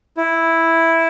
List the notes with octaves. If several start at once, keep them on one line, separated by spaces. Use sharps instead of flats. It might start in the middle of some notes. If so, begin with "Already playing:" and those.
E4